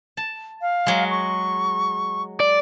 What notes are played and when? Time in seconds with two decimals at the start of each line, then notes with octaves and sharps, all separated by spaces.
0.17 A5
0.62 F5
0.87 F#3 G#3
1.10 C#6
2.40 D5